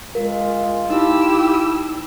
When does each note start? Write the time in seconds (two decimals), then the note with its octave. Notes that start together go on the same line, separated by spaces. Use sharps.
0.15 G#3 F4 A#4
0.90 D#4 E4 G4 E6